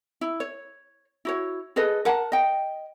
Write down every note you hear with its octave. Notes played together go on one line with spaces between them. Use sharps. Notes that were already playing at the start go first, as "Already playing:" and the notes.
E4
C#5
E4 F#4 C#5
G#4 A4 B4 D#5
A#4 F#5 A5
D#5 G5